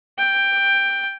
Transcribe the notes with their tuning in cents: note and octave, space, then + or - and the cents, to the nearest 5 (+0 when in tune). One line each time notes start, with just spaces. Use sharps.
G5 +5